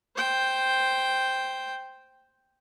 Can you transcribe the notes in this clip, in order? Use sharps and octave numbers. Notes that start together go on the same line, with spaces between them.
C5 G5